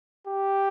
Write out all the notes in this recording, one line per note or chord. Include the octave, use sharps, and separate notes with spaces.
G4